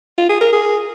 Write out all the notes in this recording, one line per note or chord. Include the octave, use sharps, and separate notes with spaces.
F4
G#4
A#4
G#4